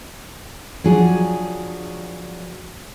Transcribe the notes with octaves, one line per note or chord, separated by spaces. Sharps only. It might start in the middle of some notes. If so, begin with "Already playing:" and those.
F3 F#3 D4 G#4